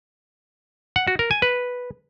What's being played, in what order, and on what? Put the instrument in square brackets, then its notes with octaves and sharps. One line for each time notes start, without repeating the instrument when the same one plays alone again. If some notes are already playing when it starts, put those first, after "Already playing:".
[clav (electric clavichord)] F#5
F#4
A#4
G#5
B4